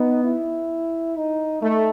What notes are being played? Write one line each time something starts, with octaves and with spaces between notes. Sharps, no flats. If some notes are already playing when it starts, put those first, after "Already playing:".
Already playing: B3 D#4
E4
D#4
A3 D#4